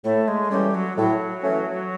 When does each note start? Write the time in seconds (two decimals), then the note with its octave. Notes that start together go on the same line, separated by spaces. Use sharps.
0.04 A2 A3
0.28 G#3
0.51 E3 G3 A3 C#4
0.74 F#3
0.97 A2 F#3
1.43 E3 A3 C#4